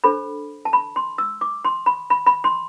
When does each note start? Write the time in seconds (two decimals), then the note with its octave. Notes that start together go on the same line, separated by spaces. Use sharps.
0.04 D4 A4 C5 B5
0.65 A5
0.73 B5
0.96 C6
1.18 E6
1.41 D6
1.65 C6
1.86 B5
2.10 B5
2.26 B5
2.44 C6